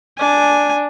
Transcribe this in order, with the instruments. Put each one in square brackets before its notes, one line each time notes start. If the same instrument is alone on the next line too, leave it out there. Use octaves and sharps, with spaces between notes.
[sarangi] D4 [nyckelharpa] G#5